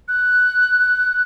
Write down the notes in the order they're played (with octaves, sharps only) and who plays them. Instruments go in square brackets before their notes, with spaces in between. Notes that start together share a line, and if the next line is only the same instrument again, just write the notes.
[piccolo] F#6